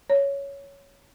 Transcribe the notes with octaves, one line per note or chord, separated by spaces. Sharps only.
C#5